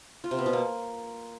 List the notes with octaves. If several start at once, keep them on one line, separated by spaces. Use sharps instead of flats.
F4
C3
B3
B2
A#3